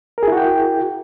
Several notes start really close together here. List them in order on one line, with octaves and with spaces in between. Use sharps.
A#4 G#4 E4 F#4 G5